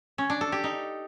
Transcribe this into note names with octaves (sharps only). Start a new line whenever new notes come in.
C#4
D4
A4
G4
D#4